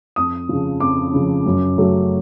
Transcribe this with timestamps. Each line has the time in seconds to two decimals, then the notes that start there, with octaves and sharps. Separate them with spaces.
0.16 F2 D#6
0.49 C#3 F3
0.80 F2 D6
1.14 C#3 F3
1.46 F#2
1.78 C#3 F#3 A3